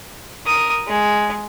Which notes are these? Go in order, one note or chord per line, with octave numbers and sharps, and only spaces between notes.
A#4 D#6
G#3